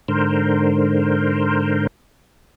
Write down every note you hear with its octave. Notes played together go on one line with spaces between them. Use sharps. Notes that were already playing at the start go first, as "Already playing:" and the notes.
G#2 D3 A#4 C5